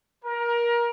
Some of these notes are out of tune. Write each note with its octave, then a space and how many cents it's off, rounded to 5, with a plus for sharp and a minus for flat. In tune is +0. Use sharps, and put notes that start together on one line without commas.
A#4 +25